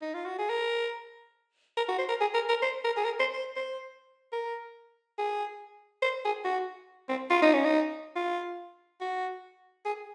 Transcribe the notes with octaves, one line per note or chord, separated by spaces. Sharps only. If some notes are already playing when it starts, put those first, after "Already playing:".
D#4
F4
F#4
G#4
A#4
A#4
F#4
C5
A#4
G#4
A#4
A#4
C5
A#4
G#4
A#4
C5
C5
C5
A#4
G#4
C5
G#4
F#4
C4
F4
D#4
C#4
D#4
F4
F#4
G#4